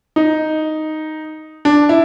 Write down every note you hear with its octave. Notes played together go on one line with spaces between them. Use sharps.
D#4
D4
E4